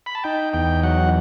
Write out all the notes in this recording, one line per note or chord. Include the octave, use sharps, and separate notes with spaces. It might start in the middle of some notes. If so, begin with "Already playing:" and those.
B5
A5
D#4 G5
E2 G5
F#3 F#5